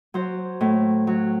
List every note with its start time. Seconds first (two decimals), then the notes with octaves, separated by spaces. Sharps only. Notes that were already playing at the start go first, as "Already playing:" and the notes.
0.14 F#3 C5
0.60 A2
1.07 F#3